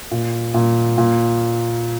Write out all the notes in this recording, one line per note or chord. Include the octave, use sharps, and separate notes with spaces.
A#2
A#2
A#2